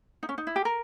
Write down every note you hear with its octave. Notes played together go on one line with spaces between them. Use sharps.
D#4
C#4
D#4
E4
G4
A#4